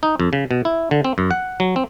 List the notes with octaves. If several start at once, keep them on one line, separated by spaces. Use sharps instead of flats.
D#4
F2
C#3
B2
E4
D3
C4
F#2
F#5
F#3
C4